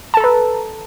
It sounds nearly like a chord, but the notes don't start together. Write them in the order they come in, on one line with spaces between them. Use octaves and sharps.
A5 A4 A#5 B4